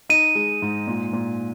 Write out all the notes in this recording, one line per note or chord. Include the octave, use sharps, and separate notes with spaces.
D#4 D#7
G#3
G#2
A#2
A#2